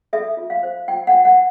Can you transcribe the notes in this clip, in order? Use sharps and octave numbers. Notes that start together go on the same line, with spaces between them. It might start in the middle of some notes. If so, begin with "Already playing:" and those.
A4 E5
F4
F5
C5
F4 G5
F#5
F4
F#5